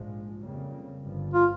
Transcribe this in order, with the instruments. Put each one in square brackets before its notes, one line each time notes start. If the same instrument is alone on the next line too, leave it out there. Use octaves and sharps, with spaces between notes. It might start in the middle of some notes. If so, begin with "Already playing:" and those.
Already playing: [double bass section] A#1 G#2 F3 G#3
F2 C#3 G3 A#3
G1 G2 F3
[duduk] F4